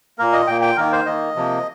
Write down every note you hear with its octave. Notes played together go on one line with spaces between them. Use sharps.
A#2 A#3 A#4
D#5
A#2 A#3 G5
G5
D#3 A#3 A#4
C5
D#3 A#3 D#5
C3 F3 A#3